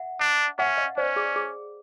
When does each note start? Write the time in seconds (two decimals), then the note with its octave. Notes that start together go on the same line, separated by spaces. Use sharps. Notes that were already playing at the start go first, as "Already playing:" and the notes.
Already playing: E5 F#5
0.20 D4
0.58 C#4 E5 F#5
0.77 D#5 F5
0.97 C#4 C5 D5
1.16 G#4
1.36 G#4